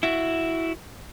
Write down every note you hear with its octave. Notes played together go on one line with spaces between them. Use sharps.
E4 F#4